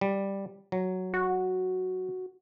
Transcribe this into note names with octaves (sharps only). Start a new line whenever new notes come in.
G3
F#3
F#4